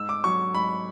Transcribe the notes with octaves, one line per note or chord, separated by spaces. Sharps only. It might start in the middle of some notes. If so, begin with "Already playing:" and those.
Already playing: G#2 E6
D6
F#3 C#6
G#2 B5